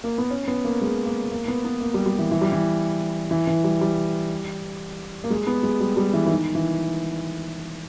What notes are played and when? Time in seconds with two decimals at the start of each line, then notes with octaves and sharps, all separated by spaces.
0.04 A#3
0.18 B3
0.31 C#4
0.48 B3
0.65 A#3
0.81 G#3
1.06 A#3
1.31 A#3
1.48 B3
1.65 B3
1.81 A#3
1.94 G3
2.06 G3
2.19 E3
2.31 E3
2.41 G3
2.52 E3
3.31 E3
3.47 E3
3.64 G3
3.81 G3
5.24 A#3
5.30 G#3
5.47 B3
5.63 G#3
5.80 G3
5.97 G3
6.13 E3
6.26 E3
6.30 D#3
6.55 E3